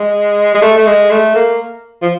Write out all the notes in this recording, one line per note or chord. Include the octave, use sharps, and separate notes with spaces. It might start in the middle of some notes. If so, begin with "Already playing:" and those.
Already playing: G#3
G#3
A3
A3
G#3
A3
A#3
F3